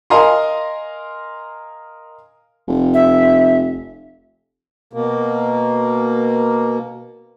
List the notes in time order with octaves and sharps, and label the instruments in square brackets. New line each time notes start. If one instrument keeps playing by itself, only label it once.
[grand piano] A#4 D#5 F5 G#5 A#5 C6
[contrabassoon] F1
[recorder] E5
[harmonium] B2 A#3